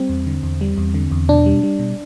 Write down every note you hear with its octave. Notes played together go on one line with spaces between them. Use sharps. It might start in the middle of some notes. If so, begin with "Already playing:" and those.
Already playing: G3 C4
E2
D3
E2
G3
E2
D3
E2
B2 D4
G3
G3
B2